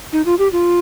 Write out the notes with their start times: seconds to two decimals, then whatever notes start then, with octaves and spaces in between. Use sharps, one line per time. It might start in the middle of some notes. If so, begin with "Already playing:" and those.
0.13 D#4
0.26 F4
0.39 G4
0.52 F4